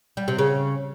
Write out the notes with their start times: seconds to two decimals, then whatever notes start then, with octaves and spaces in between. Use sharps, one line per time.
0.17 G3
0.28 C3
0.38 C#3